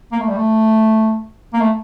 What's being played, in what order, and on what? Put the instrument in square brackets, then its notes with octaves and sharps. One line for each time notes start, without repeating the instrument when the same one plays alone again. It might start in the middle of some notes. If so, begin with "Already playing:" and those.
[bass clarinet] A#3
A3
G3
A3
A#3
A3